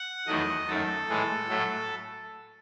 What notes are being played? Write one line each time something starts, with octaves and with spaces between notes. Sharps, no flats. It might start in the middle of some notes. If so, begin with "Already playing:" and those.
Already playing: F#5
E2 D#3 F#3 A3 D#5
F#2 D#3 A3 A4
A2 E3 G#3
A2 F#3 A3